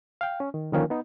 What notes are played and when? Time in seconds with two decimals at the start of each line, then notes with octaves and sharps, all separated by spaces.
0.21 F5 G5
0.40 C#4
0.54 D#3
0.72 D3 D#3 F3 A#3 C#4
0.90 B3 D#4